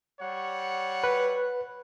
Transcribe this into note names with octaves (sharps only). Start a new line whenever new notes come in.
G3 C#5 F#5
B4